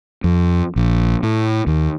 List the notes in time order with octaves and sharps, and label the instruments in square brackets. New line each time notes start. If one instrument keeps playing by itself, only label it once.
[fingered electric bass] F2
A#1
A2
D#2